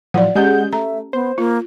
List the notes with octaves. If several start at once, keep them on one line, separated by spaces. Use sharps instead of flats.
A2 F3 F#3 D5 F#5
G#3 C#4 G4 G#4 F#5 G6
A3 E5 A#5
B3 C5
A#3 F4